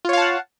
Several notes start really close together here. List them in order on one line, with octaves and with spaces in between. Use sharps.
F4 C#5 F5 A5 F#5